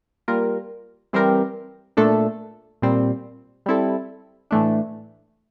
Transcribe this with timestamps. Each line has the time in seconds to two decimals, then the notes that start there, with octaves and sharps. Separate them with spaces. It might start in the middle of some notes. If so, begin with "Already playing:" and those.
0.28 G3 A#3 F4 A#4
1.13 E3 G3 C4 G4 A#4
1.97 A#2 A3 D4 A4
2.82 A#2 G3 C4
3.66 G3 C4 E4 A4
4.51 A2 E3 A3 D4